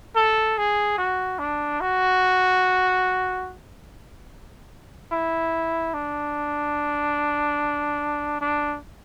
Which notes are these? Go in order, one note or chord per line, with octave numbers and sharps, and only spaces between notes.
A4
G#4
F#4
D4
F#4
E4
D4
D4